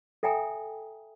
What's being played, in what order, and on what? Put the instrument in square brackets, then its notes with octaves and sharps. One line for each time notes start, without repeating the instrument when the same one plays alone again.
[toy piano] A4 E5 G5 G#5 A#5 D#6